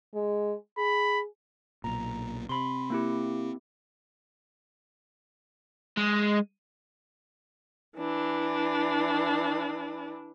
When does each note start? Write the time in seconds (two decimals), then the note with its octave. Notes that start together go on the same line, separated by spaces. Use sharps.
0.14 G#3
0.78 G#4 B5
1.84 B1 A#2 A#5
2.49 C3 B5 C6
2.90 A#3 E4 G4
5.97 G#3
7.97 E3 D4